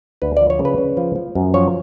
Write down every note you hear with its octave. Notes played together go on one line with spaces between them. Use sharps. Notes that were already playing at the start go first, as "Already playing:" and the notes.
D2 B4
F3 D5
C#5
C#3
B4
C#3
F3
F3
F#2
F3 C#5